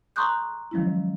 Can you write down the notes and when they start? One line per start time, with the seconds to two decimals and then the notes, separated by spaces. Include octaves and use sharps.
0.16 A#5 C6 C#6 D#6 F#6 G6
0.71 D#3 F3 F#3 G#3 C#4 E4